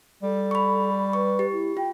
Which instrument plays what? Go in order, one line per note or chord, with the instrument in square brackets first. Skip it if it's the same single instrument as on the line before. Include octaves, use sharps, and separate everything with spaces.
[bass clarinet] G3 [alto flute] A4
[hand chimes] B5 C#6
[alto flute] B4 [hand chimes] C#6
[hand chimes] G4
[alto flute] E4
[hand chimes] F4 [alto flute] G5